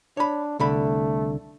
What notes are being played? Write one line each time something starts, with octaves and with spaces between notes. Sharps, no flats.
D4 C#5 B5
C2 D3 A3 B5